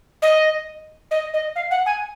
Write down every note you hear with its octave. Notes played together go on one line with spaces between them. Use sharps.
D#5
D#5
D#5
F5
F#5
G#5